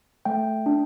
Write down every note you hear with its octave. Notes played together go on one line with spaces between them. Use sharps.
A3 G5
D4